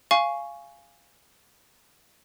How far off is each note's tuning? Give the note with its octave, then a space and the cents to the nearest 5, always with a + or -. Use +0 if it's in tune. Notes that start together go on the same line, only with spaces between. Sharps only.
F5 -10 G#5 +0 C#6 +0